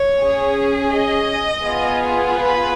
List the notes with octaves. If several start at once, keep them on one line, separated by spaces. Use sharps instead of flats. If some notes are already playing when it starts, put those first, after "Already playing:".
Already playing: C#5
C#4 G#4
D#5
B3 F4 G#4
B4